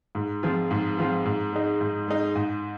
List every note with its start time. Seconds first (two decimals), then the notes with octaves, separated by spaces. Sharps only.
0.15 G#2
0.43 F3 C4 F4 G#4
0.71 G#2
0.97 F3 C4 F4 G#4
1.25 G#2
1.53 G#3 D#4
1.81 G#2
2.08 G#3 D#4
2.35 G#2